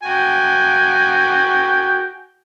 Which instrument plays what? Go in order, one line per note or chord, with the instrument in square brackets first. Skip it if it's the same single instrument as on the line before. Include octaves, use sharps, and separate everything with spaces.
[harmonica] F#4 G5 G#5